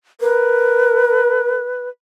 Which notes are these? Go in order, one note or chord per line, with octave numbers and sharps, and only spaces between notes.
A#4 B4